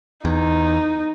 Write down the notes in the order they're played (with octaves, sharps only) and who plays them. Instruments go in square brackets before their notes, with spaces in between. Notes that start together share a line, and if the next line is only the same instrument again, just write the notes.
[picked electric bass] E2 [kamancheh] D#4